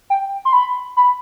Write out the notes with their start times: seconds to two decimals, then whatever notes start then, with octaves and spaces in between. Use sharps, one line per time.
0.10 G5
0.45 C6
0.53 B5
0.97 B5